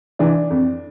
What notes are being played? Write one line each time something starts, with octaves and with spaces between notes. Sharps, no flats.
E3 D4
F2